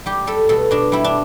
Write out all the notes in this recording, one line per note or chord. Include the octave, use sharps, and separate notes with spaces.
G3 G4
G3 A4
B2 A4
B2 D4
G3 E4
D4